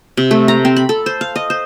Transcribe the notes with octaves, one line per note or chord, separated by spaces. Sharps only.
C3
A3
A#5
C4
B5
A4
C5
F5
D#5
C5